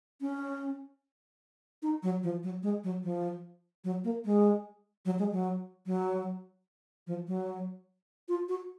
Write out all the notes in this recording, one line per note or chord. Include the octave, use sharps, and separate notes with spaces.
C#4
D#4
F#3
F3
F#3
G#3
F#3
F3
F#3
A#3
G#3
F#3
G#3
F#3
F#3
F3
F#3
F4
F#4